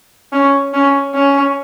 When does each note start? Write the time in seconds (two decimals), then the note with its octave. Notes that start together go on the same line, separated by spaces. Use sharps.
0.32 C#4
0.73 C#4
1.14 C#4